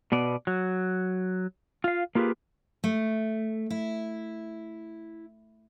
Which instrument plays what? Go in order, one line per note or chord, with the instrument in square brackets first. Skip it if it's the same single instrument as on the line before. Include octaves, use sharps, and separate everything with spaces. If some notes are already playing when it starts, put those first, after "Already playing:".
[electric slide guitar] B2 B3 D5
F#3
F4 F5
A#3 F4 G4 G#4 B4
[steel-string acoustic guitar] A3
E4